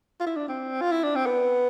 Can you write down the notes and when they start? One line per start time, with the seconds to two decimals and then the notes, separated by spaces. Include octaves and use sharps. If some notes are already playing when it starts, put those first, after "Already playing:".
0.20 F4
0.27 E4
0.37 D4
0.48 C4
0.81 F4
0.92 E4
1.03 D4
1.15 C4
1.26 B3